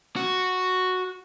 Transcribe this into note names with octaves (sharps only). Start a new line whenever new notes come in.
F#4